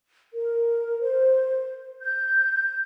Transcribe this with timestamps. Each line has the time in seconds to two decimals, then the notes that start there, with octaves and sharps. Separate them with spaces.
0.34 A#4
1.01 C5
2.02 G6